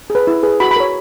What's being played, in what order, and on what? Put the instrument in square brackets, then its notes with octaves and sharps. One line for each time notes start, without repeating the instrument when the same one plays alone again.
[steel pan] G#4
B4
E4
G#4 B4
F#4 B5
B5
A#4 C#5